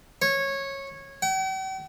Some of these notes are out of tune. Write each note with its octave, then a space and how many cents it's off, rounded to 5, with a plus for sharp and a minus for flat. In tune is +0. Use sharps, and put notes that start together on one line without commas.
C#5 -15
G5 -45